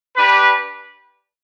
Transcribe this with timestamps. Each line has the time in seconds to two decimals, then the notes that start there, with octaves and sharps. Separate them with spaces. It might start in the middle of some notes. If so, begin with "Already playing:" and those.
0.16 D4 G4 B4